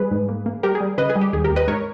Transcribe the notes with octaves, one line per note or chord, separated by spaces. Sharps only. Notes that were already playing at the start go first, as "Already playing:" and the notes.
Already playing: G3 G#4 B4
G#2
A#3
A#3
G3 G4 A#4
G#4
G3
C#3 B4 D#5
G#4
G3
G4
D#2 G#4
G4 A#4
D#2
B4 D#5
G#2 A#4 C#5